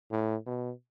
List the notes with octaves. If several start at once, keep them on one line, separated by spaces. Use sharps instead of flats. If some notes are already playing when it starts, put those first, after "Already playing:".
A2
B2